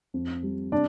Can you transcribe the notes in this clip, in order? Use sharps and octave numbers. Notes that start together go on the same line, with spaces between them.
F2
G3
C3 D4 D5